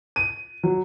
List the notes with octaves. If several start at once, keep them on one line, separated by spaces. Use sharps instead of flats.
D#7
F#3